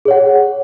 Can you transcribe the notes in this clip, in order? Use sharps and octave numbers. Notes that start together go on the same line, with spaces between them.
G#4 C#5 F#5